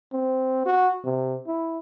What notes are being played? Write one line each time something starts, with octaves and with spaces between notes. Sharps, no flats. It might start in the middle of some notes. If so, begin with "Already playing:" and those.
C4
F#4
C3
E4